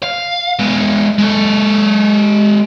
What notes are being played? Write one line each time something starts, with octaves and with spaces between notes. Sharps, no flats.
F5
G#3 B3
G#3 A4